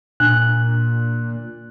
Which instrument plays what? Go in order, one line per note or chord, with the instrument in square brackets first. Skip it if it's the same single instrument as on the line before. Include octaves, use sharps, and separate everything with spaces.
[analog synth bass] A#2 [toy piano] D4 [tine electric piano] F#6